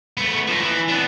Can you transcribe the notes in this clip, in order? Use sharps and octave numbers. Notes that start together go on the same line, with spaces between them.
A3 B3
F3 D#4
E3
B3 D4